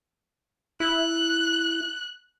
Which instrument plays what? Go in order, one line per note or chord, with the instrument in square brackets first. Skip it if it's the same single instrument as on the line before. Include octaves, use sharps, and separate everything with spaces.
[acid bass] E4 [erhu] F#6